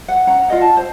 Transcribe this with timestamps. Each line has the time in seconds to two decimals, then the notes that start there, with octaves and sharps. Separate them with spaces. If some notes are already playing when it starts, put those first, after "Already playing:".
0.08 F#5
0.27 C#4 F#5 A#5
0.48 F4 D5 D#5 F#5
0.61 A5
0.77 C5